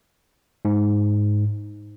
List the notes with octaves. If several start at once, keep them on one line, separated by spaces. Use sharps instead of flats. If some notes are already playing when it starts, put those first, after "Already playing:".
G#2